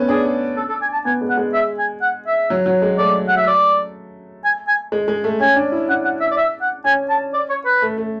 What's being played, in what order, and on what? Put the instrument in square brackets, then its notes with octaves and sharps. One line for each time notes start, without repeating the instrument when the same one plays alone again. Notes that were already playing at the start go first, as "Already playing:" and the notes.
Already playing: [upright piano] A3 B3 C#4
[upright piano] D4 [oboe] G#4
[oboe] A4
A4
G#5
A5
[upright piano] B3 [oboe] G#5
[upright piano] G#3
[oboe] F#5
[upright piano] G#3
[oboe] E5
G#5
F#5
E5
[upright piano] F#3
F#3
G#3
[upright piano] A3 [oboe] D5
[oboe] F#5
E5
D5
G#5
G#5
[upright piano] G#3
G#3
A3
[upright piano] C#4 [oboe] G#5
[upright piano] D4
E4
[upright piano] D4 [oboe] F#5
[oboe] F#5
E5
D5
E5
F#5
[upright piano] C#4 [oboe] G#5
[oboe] A5
D5
C#5
B4
[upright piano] A3
A3